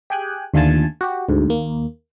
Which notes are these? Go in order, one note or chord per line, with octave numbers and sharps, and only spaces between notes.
G4 G#4 G5 G#5 F#6
D#2 D3 A3 F4 G#5 A5
F#4 G4
D2 G#2
D#2 A#3